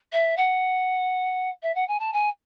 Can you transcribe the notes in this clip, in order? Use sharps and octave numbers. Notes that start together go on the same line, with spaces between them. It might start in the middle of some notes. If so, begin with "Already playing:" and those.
E5
F#5
E5
F#5
G#5
A5
G#5